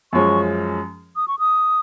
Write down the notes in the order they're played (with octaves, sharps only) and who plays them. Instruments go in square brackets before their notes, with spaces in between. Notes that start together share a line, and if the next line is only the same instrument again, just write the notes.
[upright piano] F#2 F3 G#3 C#4 [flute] C#6
[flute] D#6
C#6
D#6